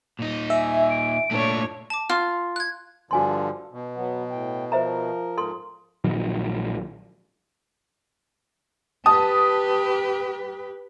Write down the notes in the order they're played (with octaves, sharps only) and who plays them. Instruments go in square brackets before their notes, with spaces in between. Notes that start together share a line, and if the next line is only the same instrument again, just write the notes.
[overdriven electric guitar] A#2 D#4
[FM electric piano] E5 [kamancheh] G#5
[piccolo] D7
[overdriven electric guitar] A#2 A3 [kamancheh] D4 C#5
[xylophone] A5 D6
[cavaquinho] F4 [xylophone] F6
[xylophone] F#6 G#6
[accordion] G2 D3 F3 [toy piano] F#4 G#5 C6
[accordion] B2
[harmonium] F#3 B3
A2 G5
[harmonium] F3 A#4 [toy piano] C5 E5 A#5
[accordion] G#2 [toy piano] A4 C6
[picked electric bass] A#1 D#3 F#3
[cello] G4 B4 [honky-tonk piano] A5 D#6